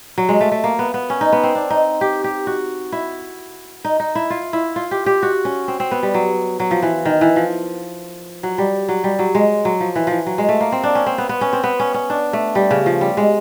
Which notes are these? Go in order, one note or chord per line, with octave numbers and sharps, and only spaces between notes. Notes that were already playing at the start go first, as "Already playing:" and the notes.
F#3
G#3
A3
A3
A#3
B3
B3
C#4
D#4
B3
C4
D4
D#4
G4
G4
F#4
E4
D#4
D#4
E4
F4
E4
F4
G4
G4
F#4
C#4
C4
C4
B3
G3
F#3
F#3
F3
E3
D#3
E3
F3
F#3
G3
F#3
G3
F#3
G#3
F#3
F3
E3
E3 F3
F#3
G#3
A3
A#3
C4
D4
C#4
C4
B3
B3
C#4
C4
B3
C#4
C#4
D4
A3
G3
C#3
F3
G3
G#3